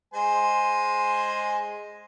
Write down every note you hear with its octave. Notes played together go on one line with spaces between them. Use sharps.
G#3 C5 G#5